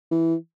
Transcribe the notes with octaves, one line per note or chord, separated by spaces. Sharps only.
E3